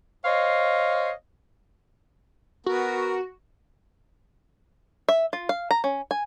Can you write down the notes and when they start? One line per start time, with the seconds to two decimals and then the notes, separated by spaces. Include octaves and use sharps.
0.25 C5 C#5 D#5 F5
2.66 B3 F#4 A#4
5.09 E5
5.33 F4
5.49 F5
5.71 A#5
5.84 C#4
6.11 G#5